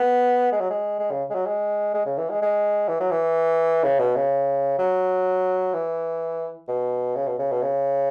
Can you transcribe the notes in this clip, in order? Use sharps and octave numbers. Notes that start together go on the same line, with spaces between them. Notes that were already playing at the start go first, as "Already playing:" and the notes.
Already playing: B3
G#3
F#3
G#3
G#3
C#3
G#3
F#3
G#3
G#3
C#3
E3
G#3
G#3
E3
F#3
E3
C#3
B2
C#3
F#3
E3
B2
C#3
B2
C#3
B2
C#3